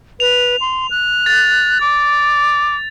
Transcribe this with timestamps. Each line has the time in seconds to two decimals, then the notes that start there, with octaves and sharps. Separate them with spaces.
0.20 B4 F7
0.61 C6
0.91 F#6
1.26 A6
1.81 D6